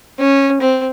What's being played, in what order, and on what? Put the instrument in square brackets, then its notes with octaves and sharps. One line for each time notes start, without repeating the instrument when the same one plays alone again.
[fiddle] C#4
C4